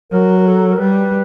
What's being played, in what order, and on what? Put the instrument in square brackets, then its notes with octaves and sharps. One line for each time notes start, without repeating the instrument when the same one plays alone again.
[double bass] F#3 [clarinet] A#4
[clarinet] A#4
A4
A#4
[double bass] G3 [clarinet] B4